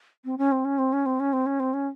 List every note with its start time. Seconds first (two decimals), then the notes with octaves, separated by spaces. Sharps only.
0.25 C4
0.38 C#4
0.52 C4
0.65 C#4
0.78 C4
0.93 C#4
1.06 C4
1.20 C#4
1.33 C4
1.46 C#4
1.60 C4
1.73 C#4